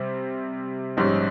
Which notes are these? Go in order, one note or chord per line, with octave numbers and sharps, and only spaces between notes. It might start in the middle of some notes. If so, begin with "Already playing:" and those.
Already playing: C3 G3 C4
A#1 G#2 G3 C#4